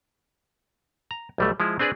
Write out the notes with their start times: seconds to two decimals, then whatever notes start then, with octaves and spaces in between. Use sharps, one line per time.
1.11 A#5
1.38 B1 G3 A3
1.60 F3 G#3 E4
1.79 C4 D4 G#4 B4 D5